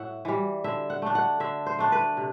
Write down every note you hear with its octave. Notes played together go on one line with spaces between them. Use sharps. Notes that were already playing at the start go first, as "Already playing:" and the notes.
Already playing: A2 E5 F#5
E3 G3
D3 E5
F#5
A3 D4
F#5
D3 E5
C5
A3 D4
B4
C3